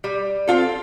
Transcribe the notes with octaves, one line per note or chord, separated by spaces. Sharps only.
G3
C4 F4 A4